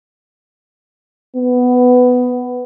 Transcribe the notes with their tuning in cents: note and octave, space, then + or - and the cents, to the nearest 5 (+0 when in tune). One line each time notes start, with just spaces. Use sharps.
B3 +10